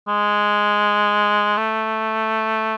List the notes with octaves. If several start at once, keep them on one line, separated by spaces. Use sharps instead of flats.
G#3
A3